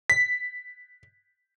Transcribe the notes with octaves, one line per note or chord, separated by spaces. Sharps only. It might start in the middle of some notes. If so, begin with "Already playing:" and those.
B6